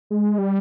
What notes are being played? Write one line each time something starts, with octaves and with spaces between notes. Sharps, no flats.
G#3
G3